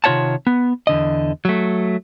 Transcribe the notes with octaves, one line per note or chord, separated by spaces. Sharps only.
C3 D#3 F4 C#5 F#5 A5
B3
E2 D3 D#5
F#3 A3